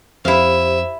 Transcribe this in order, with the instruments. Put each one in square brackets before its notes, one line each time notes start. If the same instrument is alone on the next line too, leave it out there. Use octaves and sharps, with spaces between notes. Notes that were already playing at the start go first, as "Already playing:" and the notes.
[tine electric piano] F2 [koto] E4 F5 [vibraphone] G4 C5 [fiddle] E5